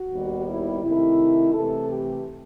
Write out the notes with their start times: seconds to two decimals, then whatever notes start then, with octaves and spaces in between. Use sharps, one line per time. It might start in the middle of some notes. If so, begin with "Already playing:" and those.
Already playing: F#4
0.12 D#2 D#3 G3 B3
0.49 E4
0.83 C3 D#3 A3 E4
1.53 C3 E3 A3 A4
1.89 G4